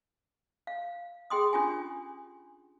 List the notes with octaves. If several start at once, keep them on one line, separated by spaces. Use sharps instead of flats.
F5
G#4 G5 C6 D#6
C#4 D4 F4 G4 G#5